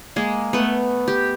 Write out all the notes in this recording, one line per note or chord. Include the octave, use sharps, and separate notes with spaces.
G#3 A#3 G#4
A3 B3
G4